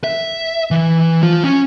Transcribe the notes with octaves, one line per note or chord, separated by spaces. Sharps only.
E5
E3
F3 F4
C#4